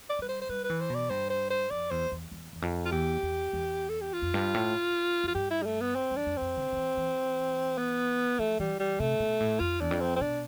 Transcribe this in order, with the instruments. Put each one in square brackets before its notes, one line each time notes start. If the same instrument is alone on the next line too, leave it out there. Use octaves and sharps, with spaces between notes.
[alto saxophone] D5
[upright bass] G3 [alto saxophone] B4
[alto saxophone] C5
C5
[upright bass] G3 [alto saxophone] B4
[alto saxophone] B4
[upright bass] E3
[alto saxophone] C5
[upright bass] B2
[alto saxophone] D5
[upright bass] G2 [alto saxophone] C5
[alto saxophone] C5
C5
[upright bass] F2 [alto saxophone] D5
[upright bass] E2 [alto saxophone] C5
[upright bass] E2
E2
E2
F2
[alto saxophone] F4
[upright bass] E2 [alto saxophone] G4
[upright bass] E2
E2
[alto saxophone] A4
G4
F4
[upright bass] F2
G2
A2
[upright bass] F2 [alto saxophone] F4
[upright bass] G2 [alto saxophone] G4
[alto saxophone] E4
G3
A3
B3
C4
[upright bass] F2
[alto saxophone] D4
[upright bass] F2
[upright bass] F2 [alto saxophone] C4
[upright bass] D3
D3
E3
E3
[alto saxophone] B3
[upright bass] F3 [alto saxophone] A3
[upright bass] E3 [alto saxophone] G3
[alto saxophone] G3
[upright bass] C3 [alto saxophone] A3
[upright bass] B2
A2
[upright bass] F2 [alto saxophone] F4
[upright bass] E2 [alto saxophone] D4
[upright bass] F2
[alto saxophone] C4
C4
[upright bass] B2 [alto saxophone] D4